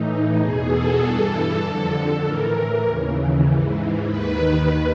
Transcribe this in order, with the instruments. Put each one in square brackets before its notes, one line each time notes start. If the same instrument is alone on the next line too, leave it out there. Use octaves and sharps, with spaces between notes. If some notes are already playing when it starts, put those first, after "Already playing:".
Already playing: [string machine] A2 E3 D#4
E2 B2 G#4
A4
G2 E3 A4
F2 D3
A2 E3 A#4
D#2 C#3 E3
G#2 E3
D#2 D#3 B4